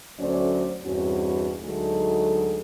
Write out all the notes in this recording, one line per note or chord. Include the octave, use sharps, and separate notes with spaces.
D2 F#3 A3 C#4 C5 D5
E2 G2 B2 C4 C#4 F#4
D2 F#3 G#3 A3 D#4 A4